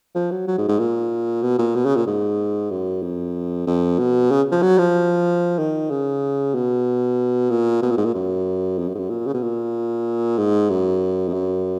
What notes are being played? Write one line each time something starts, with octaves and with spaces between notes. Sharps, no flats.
F3
F#3
F#3
G#2
G#2
A#2
B2
A#2
B2
C#3
A#2
G#2
F#2
F2
F2
B2
C#3
F3
F#3
F3
D#3
C#3
B2
A#2
B2
A#2
G#2
A#2
F#2
F2
F#2
G#2
F#2
A#2
C#3
B2
A#2
G#2
F#2
F2
F#2